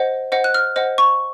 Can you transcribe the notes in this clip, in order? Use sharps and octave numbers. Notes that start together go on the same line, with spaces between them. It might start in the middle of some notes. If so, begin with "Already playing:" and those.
Already playing: C5 D#5 F#5
C5 D#5 F#5
F#6
F6
C5 D#5 F#5
C#6